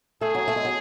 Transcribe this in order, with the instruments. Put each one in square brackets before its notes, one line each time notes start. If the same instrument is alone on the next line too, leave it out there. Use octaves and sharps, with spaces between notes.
[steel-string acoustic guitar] A3 [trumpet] G#4
[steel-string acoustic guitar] F#3
A3
G#3
F#3